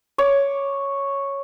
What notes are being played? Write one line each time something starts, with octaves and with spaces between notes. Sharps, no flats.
C#5 D6